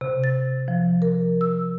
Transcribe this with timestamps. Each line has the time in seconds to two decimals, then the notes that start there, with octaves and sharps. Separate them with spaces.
0.01 C3
0.24 A6
0.68 F3
1.02 A#4
1.41 E6